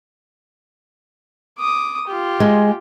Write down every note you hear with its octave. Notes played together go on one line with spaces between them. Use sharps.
D6 D#6
F4 G4
G#3